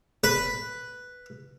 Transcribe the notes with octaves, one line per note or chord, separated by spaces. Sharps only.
B4